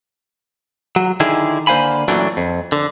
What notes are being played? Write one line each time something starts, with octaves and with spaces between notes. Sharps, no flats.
F#3
D3 D#3 E4 G#4
D3 A#3 C5 F5 G#5 B5
F#2 A#2 E3 F#3 A3 D4
F2
D3